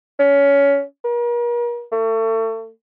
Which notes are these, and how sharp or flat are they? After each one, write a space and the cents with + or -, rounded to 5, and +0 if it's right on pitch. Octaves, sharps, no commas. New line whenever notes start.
C#4 +20
A#4 +40
A3 +35